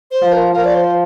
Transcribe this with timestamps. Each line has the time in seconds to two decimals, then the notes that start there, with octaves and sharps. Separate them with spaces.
0.11 C5
0.22 F3
0.32 A#4
0.53 F3 A#4
0.64 D5
0.75 C5